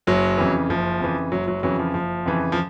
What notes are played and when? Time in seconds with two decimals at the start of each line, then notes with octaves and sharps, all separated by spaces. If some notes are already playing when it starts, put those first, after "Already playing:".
0.07 F#1 F#3
0.38 F2 C#3 E3
0.69 F#1 F3
1.00 F2 C#3 E3
1.32 F#1 F#3
1.48 F#3
1.63 F2 C#3 E3 F#3
1.79 F3
1.94 F#1 F3
2.26 F2 C#3 E3
2.52 F3